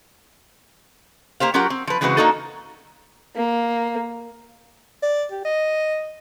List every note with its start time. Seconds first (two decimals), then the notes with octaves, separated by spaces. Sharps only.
1.40 A#3 G4 C5 F5
1.54 F#3 C#4 F4 G4 A#4 F#5
1.70 C4
1.87 F3 B4
2.01 C#3 E3 G#3 C4 F#4 B4
2.17 A#3 C4 D4 D#4 F#4 A4
3.35 A#3
5.03 D5
5.32 G4
5.45 D#5